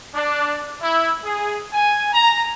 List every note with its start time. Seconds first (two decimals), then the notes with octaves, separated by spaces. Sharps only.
0.15 D4
0.82 E4
1.25 G#4
1.73 G#5
2.13 A#5